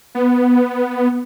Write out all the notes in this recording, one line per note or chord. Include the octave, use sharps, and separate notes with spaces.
B3